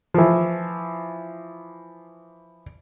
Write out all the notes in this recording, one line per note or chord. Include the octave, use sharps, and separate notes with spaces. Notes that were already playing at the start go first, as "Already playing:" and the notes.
E3 F3